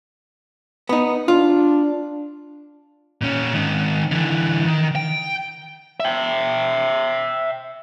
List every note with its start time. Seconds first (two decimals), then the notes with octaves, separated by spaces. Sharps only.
0.89 B3 D#4
1.28 D4 F4
3.21 A#2 C#4
3.53 G#2 D#3
4.12 D3 E3
4.67 D#3
4.96 G5
6.00 E5 G5